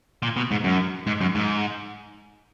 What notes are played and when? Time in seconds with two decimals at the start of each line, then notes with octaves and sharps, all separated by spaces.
0.23 A#2
0.37 B2
0.51 G#2
0.64 F#2
1.07 G#2
1.21 F#2
1.35 G#2